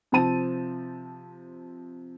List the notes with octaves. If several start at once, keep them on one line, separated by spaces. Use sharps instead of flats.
C3 F3 C4 A5 D#7